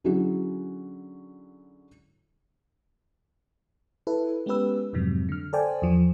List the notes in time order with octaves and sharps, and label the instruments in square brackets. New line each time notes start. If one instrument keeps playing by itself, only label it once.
[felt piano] D3 F#3 C#4 E4 F#4 G#4
[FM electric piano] E4 A4 B4
G#3 B3 C#4 G4 B4 E6
F2 G#2 C3 F#3
D3 F6
A4 C5 D5 G5 G#5
E2 F3